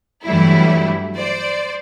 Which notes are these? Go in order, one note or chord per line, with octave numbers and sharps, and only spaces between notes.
G2 E3 F#3 G3 A3 E4
C5 D5